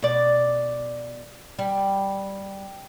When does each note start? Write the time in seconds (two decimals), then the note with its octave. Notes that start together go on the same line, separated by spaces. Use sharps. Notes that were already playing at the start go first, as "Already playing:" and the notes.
0.02 B2 D5
1.59 G3